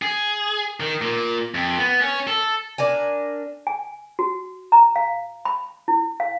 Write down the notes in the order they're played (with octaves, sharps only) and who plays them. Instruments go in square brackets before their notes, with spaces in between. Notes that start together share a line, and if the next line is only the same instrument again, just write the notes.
[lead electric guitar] G#4
D#3
A#2
F2
B3
C#4
A4
[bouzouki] D4 A#4 G#5
[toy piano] G#5
F#4
A#5
F5
B5
E4
F5